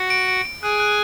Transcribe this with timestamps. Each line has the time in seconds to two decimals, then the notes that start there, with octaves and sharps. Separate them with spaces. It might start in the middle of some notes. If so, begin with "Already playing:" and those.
Already playing: F#4 F#5
0.10 D7
0.28 D7
0.45 D7
0.62 G#4 G#5 F#6
0.80 F#6